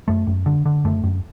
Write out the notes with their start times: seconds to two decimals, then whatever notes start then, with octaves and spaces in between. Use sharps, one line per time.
0.08 F#2 A3
0.27 F#2
0.46 D3
0.66 D3
0.85 F#2 A3
1.04 F#2